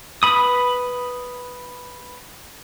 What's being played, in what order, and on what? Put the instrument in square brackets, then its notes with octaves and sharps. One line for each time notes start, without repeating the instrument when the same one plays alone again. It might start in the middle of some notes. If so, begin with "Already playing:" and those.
[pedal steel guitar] B4 B5 D#6